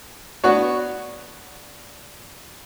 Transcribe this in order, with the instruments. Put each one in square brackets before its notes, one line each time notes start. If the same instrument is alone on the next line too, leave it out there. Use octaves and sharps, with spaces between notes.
[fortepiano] B3 D4 F#4 C#5